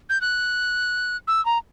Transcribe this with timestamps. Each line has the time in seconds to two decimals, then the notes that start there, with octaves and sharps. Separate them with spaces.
0.09 G6
0.21 F#6
1.28 E6
1.45 A#5